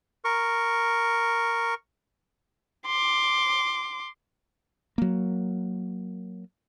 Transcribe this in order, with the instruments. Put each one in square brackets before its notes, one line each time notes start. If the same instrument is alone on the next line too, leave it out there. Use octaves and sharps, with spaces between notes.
[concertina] A#4 C#6
[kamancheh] C6 D6
[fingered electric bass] F#3 A#3